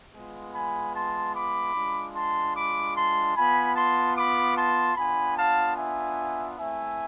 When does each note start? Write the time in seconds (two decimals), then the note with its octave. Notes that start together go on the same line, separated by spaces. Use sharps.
0.14 G#3 B3 F4
0.54 G#5 B5
0.95 A5 C6
1.35 B5 D6
1.75 G#3 D4 F4
2.15 A5 C6
2.55 B5 D6
2.95 A5 C6
3.36 B3 F4 G#5 B5
3.75 A5 C6
4.16 B5 D6
4.57 A5 C6
4.96 B3 D4 F4 G#5 B5
5.37 F5 A5
5.76 E5 G#5
6.57 A3 C4 E4 E5 G#5